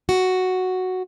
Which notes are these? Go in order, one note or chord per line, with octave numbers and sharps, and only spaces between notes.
F#4